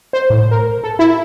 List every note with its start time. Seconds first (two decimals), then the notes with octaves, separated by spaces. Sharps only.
0.13 C5
0.30 A2
0.51 A#4
0.84 A4
0.99 E4